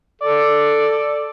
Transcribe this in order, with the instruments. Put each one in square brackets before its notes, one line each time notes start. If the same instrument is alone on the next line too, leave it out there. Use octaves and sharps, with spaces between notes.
[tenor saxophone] A4 [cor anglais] D5